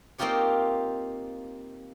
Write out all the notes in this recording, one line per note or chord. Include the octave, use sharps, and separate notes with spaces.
A#3 C4 D#4 F4 G4 C#5